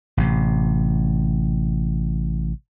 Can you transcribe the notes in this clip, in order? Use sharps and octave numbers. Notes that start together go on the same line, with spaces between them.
A1 C3